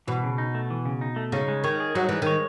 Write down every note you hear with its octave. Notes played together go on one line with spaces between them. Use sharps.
B2 E3
C#3
D#4
A3
E3
C#3
D#4
A3
C#3 D#4
G#3
D#3 C#5
G#4
F#3 D#4
E3 G#3
D#3 C#5